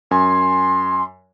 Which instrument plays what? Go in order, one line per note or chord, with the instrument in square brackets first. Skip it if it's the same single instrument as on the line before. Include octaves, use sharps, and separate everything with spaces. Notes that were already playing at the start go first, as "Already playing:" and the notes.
[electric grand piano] F#2 G#5 [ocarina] C6